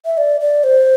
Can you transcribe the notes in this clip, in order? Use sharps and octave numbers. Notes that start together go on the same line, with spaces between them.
E5
D5
D5
C5